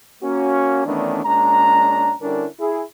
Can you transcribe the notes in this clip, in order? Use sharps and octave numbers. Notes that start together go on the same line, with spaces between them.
A#3 C#4 F#4
D#3 E3 A3 B3 C#4 D4
A#2 G#3 C#4 D4 A#5
D3 G3 C#4 D4 E4 A#4
E4 G#4